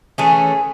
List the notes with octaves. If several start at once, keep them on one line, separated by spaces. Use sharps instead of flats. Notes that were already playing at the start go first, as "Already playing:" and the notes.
E3 A3 C#4 G#4